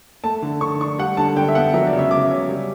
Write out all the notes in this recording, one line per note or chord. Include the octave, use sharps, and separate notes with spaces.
A3 A5
D3
D3 C#6
D4 C#6
G3 F#5
D3 A5
D3 G5
E5
B3 F#5
F#3 E5
D5
C#3
E5
C#3 D6
C#4
G3